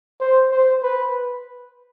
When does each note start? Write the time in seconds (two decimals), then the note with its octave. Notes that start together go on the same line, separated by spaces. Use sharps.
0.21 C5
0.51 C5
0.83 B4